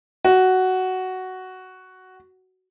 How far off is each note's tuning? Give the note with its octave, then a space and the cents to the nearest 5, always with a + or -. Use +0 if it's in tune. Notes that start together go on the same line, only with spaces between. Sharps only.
F#4 +10